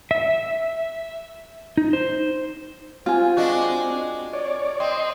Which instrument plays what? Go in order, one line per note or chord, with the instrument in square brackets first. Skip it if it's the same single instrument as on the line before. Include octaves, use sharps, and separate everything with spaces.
[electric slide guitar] E5
D#4
C5
[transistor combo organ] C4 [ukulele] F4 G#5
[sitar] G#3 D4 F#4
[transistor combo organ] C#5 D5
[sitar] C4 [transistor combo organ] D#5 C6